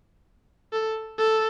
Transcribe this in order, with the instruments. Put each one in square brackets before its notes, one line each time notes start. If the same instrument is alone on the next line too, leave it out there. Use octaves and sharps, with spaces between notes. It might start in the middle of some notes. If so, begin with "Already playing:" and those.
[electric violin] A4
A4